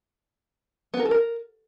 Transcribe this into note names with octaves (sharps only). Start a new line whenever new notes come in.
B3
A#4
A4
A#4